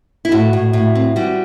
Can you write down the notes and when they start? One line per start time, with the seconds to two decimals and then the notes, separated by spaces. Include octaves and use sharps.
0.25 E4
0.32 A2 F#4
0.53 A2
0.73 A2
0.95 C4
1.16 G3 F#4